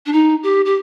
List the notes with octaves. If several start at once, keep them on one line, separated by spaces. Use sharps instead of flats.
D4
D#4
G4
G4